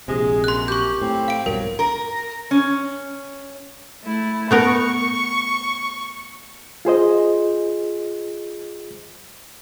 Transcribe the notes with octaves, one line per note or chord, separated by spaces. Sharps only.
A#1 C3 G#3 G#4
F#2 C6 F#6
G4 C#6 G6
A2 C4
F5 D7
B1 G2 F#3 A#4
A#4
C#4
A3 E4
A3 B3 A#4 C#6
F4 G#4 C5 D#5